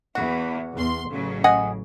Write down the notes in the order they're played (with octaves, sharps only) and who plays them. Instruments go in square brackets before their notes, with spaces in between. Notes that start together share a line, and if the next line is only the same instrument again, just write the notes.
[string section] E2 E3 [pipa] F#4
[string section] E2 C6
A1 C#3 F#3
[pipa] D#5 F#5 G#5